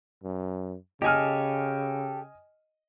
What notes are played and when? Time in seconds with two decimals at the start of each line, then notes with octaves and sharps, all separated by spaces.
0.24 F#2
1.02 C#3 G4 A4 D#5 G#5 F6